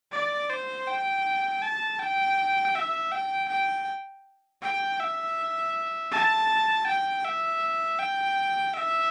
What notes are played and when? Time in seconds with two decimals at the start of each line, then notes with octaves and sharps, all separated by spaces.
0.12 D5
0.50 C5
0.88 G5
1.62 A5
2.00 G5
2.75 E5
3.12 G5
3.49 G5
4.62 G5
5.00 E5
6.12 A5
6.87 G5
7.25 E5
7.99 G5
8.74 E5